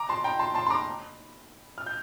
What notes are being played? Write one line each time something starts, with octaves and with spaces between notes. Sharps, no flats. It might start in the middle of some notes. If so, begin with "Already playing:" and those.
Already playing: A#5 D6
A5 C6
G5 A#5
A5 C6
A5 C6
C6
A#5 D6
F6
G6